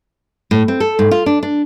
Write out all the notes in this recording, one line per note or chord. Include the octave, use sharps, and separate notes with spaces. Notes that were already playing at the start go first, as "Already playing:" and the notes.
A2
C4
A4
G#2
F4
D4
D4